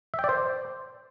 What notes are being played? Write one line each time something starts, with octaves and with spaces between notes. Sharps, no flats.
E5
G5
D5
C5